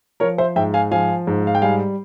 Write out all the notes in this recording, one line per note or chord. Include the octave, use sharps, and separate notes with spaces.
F3 A#4 C#5
C5 E5
G#2 E5 G5
F5 G#5
F3 F5 G#5
G#2
F5
G5
G3 F5 G#5